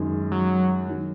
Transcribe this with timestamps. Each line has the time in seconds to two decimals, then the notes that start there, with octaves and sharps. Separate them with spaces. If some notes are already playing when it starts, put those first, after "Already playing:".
Already playing: F#2 D#3 G#3
0.32 F#3
0.88 D#3 F#3